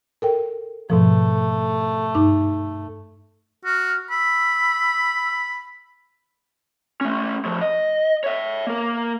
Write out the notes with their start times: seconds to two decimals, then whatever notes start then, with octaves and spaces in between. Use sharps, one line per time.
0.22 A4 A#4 G5
0.90 G#2 B2 F3 A3
2.15 G2 D#4 D6
3.65 F#4 F6
4.10 B5 E6
7.01 A3 C#4
7.45 A2 F3
7.62 D#5
8.24 C#5 E5
8.67 A#3 A#4